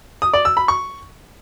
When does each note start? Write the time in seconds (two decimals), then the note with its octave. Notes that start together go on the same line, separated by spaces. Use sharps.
0.22 D#6
0.34 D5
0.45 E6
0.57 B5
0.68 C#6